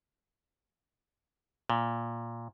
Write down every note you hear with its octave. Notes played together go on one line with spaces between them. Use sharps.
A#2